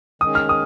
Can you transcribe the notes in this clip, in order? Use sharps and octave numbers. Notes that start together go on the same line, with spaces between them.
D#3 G#3 C#4 D#6
F6
D#6